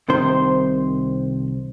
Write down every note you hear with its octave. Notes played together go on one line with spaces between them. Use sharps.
C2 C3 D#3 C5